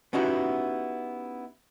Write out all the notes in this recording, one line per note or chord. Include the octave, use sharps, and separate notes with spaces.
B3 C#4 D#4 E4 F#4 G4